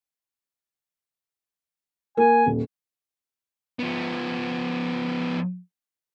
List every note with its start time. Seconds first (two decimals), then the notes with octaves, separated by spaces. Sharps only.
2.17 A#3 G#5
2.46 D#1
3.79 F3 B3